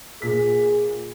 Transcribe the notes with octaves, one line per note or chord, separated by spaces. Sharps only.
A#2 G#4 B6